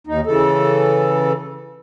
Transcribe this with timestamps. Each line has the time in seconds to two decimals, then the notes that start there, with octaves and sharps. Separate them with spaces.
0.07 D#2 D#4
0.26 C#3 E3 A4